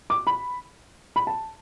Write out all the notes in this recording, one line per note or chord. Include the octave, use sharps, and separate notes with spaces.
D6
B5
B5
A5